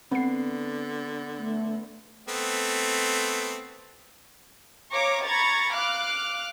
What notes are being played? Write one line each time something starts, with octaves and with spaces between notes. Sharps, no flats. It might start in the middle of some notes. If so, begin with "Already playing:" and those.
D3 B3 C4 C7
A3
A3 B3 C4
C#5 F5 A#5 C#6 D6
A#5 B5 C#6 G#6 A6
F5 D6 F6 F#6